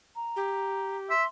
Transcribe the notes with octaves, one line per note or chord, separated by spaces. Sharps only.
A#5
G4
E5 C6